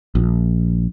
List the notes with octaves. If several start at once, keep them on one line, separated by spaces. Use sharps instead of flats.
A#1